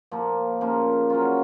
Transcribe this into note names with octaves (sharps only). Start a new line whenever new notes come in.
A#2 F3 A#3
C#3 F3 A#3 F4
C#3 F#3 C#4 F4